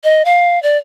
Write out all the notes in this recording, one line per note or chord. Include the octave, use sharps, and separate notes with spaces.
D#5
F5
D5